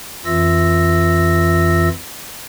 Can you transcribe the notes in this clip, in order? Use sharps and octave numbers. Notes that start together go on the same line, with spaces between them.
F2 E3 F4 E5 E6 A#6